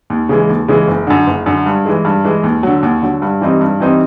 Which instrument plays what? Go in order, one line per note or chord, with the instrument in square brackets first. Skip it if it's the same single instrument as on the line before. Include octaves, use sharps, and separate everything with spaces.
[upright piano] D#2
C#3 E3 G#3
D#2
C#3 E3 G#3
F#1
F#2 D3
F#1
F#2 D3
G2
E3 G#3
G2
E3 G#3
D#2
D3 F#3
D#2
D3 F#3
G2
E3 G3 C4 D#4
G2
E3 G3 C4 D#4